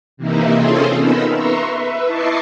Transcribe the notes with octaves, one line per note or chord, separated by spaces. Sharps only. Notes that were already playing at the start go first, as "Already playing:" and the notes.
C3 E3 A#3 D#4 E4
C4 C#4 F4 G#4 A4 C5
B3 D#4 A#4 B5 E6
B4 E5 A#5 C6 C#6
B4 E5
E4 D#5 A5 C#6 D6 C7